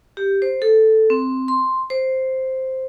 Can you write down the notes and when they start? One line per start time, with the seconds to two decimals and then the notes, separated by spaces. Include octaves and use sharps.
0.17 G4
0.42 C5
0.62 A4
1.10 C4
1.48 C6
1.90 C5